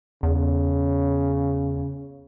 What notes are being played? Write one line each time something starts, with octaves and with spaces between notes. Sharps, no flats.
E2 C#3